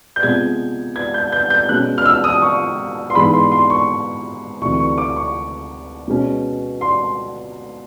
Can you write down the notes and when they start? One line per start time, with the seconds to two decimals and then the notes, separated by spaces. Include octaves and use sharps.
0.16 G6
0.23 C3 F3 G#3 B3 G#6
0.96 G#6
1.14 G6
1.32 G6
1.50 G6
1.69 B2 G#3 C#4 F#6
1.98 F6
2.06 E6
2.24 D#6
2.42 C#6
3.10 C6
3.15 G#2 E3 G#3 B3 B5
3.33 C6
3.52 C6
3.70 C#6
4.61 D2 C3 E3 C#6
4.80 C#6
4.98 D6
5.16 C#6
6.08 B2 G#3 C#4
6.81 C6